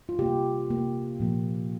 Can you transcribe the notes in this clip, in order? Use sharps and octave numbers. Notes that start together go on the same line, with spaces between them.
F4
C3 A#3 G4
C3 A#3
A#2 F3 A#3